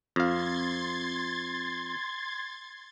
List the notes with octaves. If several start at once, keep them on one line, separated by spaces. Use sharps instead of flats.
F2 F5 C6 G#6 A6